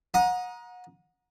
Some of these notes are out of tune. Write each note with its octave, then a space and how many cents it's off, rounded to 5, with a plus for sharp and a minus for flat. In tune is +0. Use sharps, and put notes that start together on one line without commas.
F#5 -30 A#5 +25 D#6 +0